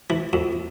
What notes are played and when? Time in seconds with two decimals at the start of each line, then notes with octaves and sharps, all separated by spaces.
0.10 E3
0.33 F2